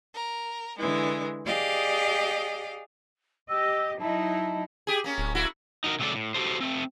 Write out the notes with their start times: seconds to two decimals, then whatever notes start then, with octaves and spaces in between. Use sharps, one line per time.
0.15 A#4
0.78 D3 E3 G#3
1.45 G4 G#4 D5 D#5 F5
3.49 G4 D#5 E6
3.99 F#3 D#4 E4 A5
4.87 G4 G#4
5.04 A#3 C#4
5.18 D1
5.35 A#3 E4 F#4
5.84 D#4 F#4 A4 A#4
5.99 C3 F#3 G#3 F#4 A4 D5
6.15 A2
6.34 F#4 G4 A4 C5
6.60 A3 C4